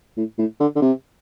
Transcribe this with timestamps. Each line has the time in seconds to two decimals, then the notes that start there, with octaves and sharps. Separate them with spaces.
0.17 A2
0.38 A2
0.60 D3
0.75 D3
0.82 C3